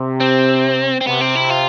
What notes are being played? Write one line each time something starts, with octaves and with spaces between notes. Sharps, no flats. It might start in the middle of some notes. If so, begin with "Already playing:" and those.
Already playing: C3
C4
C4
C3 B3
C4
E4
F4